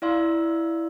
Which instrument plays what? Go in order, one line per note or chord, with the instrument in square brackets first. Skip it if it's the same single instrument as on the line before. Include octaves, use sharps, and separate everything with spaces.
[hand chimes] E4 D5 F5 C6 E6